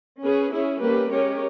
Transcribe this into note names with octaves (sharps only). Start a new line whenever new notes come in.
C#4 G#4 B4
C#4 E4 G#4
G3 A#3 C#4 G4 B4
G#3 C#4 G4 A#4 C#5